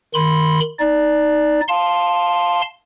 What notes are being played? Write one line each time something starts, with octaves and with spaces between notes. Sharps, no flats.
D#3 B5 C6
D#4 D5
F5 A5 C6